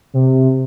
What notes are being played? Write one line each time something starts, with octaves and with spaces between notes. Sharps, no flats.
C3